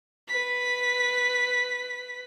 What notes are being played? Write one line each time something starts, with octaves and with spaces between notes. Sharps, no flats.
B4 B6